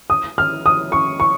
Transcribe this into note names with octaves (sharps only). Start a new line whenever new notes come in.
D#6
F6
D#6
C#6
C#6